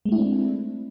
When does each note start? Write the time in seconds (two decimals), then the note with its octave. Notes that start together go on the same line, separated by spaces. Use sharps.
0.05 G#3
0.09 A3
0.12 E4
0.15 D4
0.18 C4